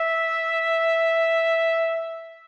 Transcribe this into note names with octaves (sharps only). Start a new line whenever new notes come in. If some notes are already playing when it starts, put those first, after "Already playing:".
Already playing: E5